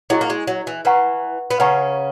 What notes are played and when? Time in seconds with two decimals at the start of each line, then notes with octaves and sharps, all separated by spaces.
0.10 F#3 E4 G#4 D#5 G#5 C#6
0.21 A#3
0.30 G#3
0.47 F#3
0.67 E3
0.85 E3 B4 F#5 A#5 C#6
1.51 B3
1.59 C#3 C#4 B4 F#5 A#5 C#6